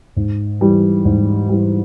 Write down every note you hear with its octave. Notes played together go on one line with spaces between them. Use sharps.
G#2
E3 G3
G#2
E3 G3